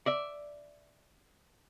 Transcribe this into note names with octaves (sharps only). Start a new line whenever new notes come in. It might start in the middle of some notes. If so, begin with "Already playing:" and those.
D5 E5